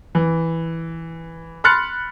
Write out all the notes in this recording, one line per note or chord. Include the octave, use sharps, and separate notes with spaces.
E3
B5 C6 F6 F#6 A6 C#7